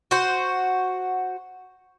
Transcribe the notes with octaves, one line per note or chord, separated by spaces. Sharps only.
F#4 C5